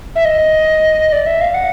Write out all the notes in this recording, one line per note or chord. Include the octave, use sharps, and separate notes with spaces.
E5
D#5
D5
E5
F5
F#5